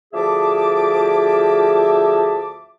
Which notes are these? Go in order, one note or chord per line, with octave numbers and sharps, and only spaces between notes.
D2 F3 G#4 E5 A5 D6